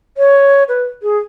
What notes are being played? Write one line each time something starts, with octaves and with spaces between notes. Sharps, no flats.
C#5
B4
G#4